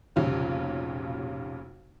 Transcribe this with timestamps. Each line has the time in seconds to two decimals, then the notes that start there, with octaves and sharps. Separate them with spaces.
0.16 F1 B1 A#2 C#3 G3